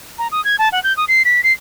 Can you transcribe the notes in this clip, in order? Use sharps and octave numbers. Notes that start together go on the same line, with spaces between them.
A#5
D#6
G#6
A5
F#5
G6
D#6
C7
B6
C7